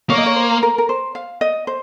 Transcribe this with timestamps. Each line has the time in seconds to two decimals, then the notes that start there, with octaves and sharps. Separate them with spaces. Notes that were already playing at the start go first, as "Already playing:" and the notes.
0.10 A#3 C#5
0.18 D#5
0.26 C#5
0.36 C5
0.63 A#4
0.78 A#4
0.89 C5
1.15 F5
1.41 D#5
1.67 C5